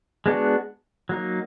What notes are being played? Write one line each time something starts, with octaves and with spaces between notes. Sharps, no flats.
G#3 B3 D4 F#4
F#3 A#3 D#4